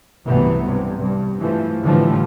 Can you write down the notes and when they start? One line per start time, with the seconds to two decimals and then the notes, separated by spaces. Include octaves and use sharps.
0.25 C2 G2 E3 F#3 A3 B3
0.61 G2 C3
0.99 G2
1.40 E3 F3 A3
1.82 A2 D3 E3 F3 G3 A3